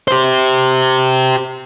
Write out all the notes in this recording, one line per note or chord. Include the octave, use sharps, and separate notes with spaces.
G4 C5